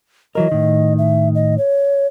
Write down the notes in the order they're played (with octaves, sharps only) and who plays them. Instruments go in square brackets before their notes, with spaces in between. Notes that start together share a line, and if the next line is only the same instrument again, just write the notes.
[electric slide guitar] E3 F#3 A#4 [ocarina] D#5
[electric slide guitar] A2 D#3
[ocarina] E5
D#5
C#5